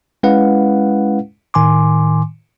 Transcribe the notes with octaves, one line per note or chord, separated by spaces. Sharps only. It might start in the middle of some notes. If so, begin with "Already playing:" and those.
G#3 C#4 E4 B4 F5 F#5
A2 D#3 G#5 C6 D6